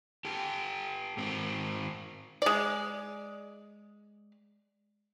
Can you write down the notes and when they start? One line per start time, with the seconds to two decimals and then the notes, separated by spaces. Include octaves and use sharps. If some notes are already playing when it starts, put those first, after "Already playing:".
0.25 G4 A4
1.17 G#2 C4
2.42 G#3 D5